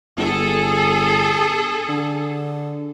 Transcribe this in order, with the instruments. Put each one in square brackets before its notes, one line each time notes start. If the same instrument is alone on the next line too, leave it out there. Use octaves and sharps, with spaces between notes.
[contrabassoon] G1 [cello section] G#4 A4
[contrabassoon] D3